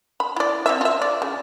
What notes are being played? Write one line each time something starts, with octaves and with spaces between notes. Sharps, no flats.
B5
E4 D5
C4 E5
F4 E5
D5
C#3